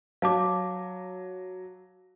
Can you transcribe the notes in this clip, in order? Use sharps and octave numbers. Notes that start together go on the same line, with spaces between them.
F#3 F5 A5 D6